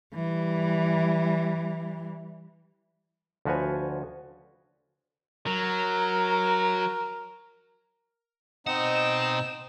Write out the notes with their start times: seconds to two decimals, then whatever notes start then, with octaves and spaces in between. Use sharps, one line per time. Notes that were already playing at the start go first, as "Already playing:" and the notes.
0.14 E3 G3
3.45 D2 F3 F#4 B4 C#5 G#5
5.47 F#3 A#4
8.67 B2 C4 D#4 D#5 F#5 E7